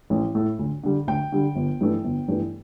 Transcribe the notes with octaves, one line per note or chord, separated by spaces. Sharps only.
A1
A2 A3
D2
D3 G3
D2 G5
D3 G3
G1
G2 E3 A3
G1
G2 E3 A3